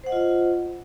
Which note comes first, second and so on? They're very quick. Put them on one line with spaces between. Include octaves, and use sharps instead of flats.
C5 F#5 D#5 F4